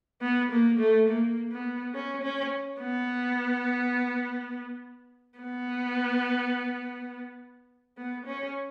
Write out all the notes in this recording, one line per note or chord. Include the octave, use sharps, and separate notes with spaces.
B3
A#3
A3
A#3
B3
C#4
C#4
B3
B3
B3
C#4